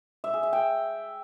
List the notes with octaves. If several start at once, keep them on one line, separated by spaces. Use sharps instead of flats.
E5
G#4
E5
G5